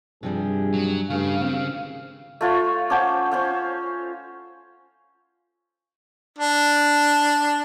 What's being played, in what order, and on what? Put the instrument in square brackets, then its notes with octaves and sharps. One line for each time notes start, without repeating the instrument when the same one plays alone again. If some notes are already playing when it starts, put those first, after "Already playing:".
[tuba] G2 [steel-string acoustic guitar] C3 F3 G3 [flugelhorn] G#4
[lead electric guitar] F#3
[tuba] G2 [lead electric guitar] C#3 [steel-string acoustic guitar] A3 G#4 [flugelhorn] F5
[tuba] G#1 [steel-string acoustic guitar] C4 [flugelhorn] F5
[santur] A3 F4 C#5
[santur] C#4 C5 [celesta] F#5 A5 D6
[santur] C#4 C5 F5
[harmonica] D4